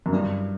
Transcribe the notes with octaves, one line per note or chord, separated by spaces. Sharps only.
F#2
G2